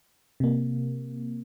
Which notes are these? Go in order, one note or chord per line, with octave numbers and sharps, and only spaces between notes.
C3 A#3